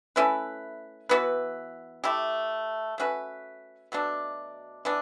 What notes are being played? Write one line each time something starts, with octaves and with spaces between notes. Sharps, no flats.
A3 C#4 E4 B4
E3 B3 F#4 B4
A3 E4 G4
A3 C#4 F#4 B4
B2 F#3 A3 D4
E3 B3 D4